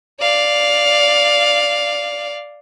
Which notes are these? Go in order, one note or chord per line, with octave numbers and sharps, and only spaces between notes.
D5 F5